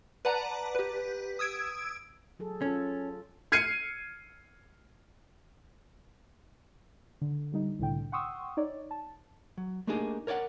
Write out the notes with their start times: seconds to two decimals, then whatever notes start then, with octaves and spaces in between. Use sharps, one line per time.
0.25 B4 D5 F#5 A5 A#5
0.75 G4 B4
1.39 D#6 E6 G#6 D7
2.39 F#3 G#4 A4
2.62 C#4 F4 A4
3.52 F6 G#6 C7 C#7 D#7
7.21 D3
7.52 D3 G3 D#4
7.79 C2 A2 D3 G5
8.12 F#5 G5 C6 C#6 D#6 E6
8.57 D#4 C#5 D5
8.91 A5
9.58 F#3
9.87 A3 A#3 D4 D#4 G4 G#4
10.27 A#4 C#5 D5 E5 F#5